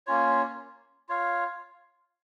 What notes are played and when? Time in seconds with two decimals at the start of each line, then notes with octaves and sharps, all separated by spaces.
0.07 A#3 C#4 F4 C#5
1.09 F4 C#5 F5